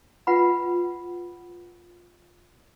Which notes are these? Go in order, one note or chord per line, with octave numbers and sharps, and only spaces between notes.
F4 B4 F#5 B5